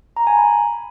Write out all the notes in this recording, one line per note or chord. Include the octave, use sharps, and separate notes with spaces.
A#5
G#5
B5